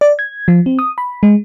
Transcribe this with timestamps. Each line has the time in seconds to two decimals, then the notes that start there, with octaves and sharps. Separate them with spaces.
0.01 D5
0.19 G#6
0.48 F3
0.66 C4
0.79 D#6
0.98 B5
1.23 G#3